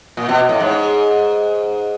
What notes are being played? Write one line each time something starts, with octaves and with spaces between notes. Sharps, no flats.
A#2
B2
A2
G#2